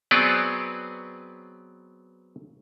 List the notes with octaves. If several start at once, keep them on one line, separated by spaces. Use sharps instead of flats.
F#3 B3 C4 G#4 B4 D5